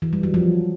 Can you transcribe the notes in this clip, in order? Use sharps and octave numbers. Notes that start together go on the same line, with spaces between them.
E3
G3
F#3
F3